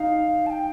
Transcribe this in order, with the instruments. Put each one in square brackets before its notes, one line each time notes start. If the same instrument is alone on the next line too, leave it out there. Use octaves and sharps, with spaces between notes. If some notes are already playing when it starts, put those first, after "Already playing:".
Already playing: [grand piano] D#4 [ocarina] F5
[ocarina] A5
G5